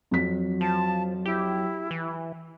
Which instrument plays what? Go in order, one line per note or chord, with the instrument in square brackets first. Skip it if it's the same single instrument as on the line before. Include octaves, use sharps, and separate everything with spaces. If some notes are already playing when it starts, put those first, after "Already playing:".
[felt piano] F2 B6 [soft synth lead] F#3
[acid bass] F3 [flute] A5
[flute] E4 [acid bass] G4
[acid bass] E3